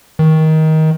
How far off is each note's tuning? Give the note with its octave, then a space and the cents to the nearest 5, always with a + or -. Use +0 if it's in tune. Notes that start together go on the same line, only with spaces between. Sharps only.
D#3 +20